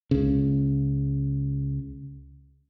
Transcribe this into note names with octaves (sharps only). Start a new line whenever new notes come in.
C#2 C#3